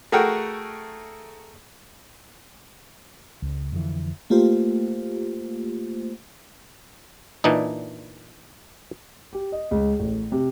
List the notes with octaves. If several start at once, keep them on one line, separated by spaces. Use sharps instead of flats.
A3 F#4 G#4 A#4 G5
C#2
F2 D3 E3
A3 A#3 F4 G4 C5
A#2 E3 D4 D#4
G4
D#5
C#2
A1
C3